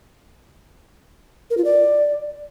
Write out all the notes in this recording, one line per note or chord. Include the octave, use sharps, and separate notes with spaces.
A#4
F4
D5